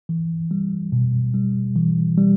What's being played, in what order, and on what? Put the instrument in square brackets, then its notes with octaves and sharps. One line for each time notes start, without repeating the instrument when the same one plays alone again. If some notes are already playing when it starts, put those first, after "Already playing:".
[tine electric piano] E3
G3
B2
G3
E3
G3